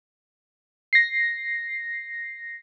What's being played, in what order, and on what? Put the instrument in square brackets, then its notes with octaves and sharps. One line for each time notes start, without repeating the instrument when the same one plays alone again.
[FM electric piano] A#6 C7